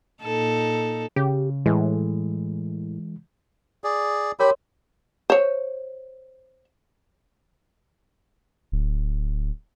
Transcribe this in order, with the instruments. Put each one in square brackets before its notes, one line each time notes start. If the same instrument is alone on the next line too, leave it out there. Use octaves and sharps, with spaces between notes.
[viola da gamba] A#2 D#4 A4
[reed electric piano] C#3 [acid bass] G4
[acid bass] A2 [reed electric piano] E3 G#3
[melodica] G#4 D5
[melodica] G4 B5 [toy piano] A#4 C#5 C6
[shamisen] C5 C#5
[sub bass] D1